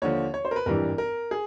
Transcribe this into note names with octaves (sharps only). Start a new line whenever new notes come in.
D#2 D3 F3 C#5
C#5
C5
A#4
B4
G#1 G2 E3 G3 A#4
A#4
G#4